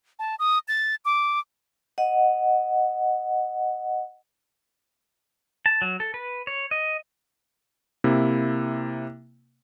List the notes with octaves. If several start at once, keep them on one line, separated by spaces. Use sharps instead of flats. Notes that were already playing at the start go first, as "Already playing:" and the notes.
A5
D#6
A6
D6
D#5 F#5
A5
F#3
A4
B4
C#5
D#5
C3 A#3 E4